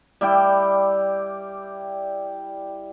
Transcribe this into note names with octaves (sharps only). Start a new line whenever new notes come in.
G3 E4 D5 G5